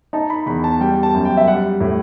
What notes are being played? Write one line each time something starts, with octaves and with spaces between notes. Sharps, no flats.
D#4 A5
B5
E2 B5
A5
G3 G5
A5
F#2
G5
E5
G3 F#5
A2